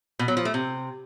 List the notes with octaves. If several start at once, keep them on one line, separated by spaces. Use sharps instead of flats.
B2
F#3
F3
A3
C3